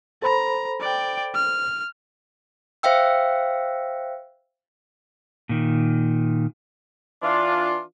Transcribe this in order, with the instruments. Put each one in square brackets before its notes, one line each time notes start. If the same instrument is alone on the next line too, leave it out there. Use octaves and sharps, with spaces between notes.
[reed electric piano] A4 C5 B5 [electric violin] A#5
[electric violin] D5 G5
F6
[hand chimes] C5 E5 F5 G5 E6
[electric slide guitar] A#2 D#3
[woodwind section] E3 D4 F4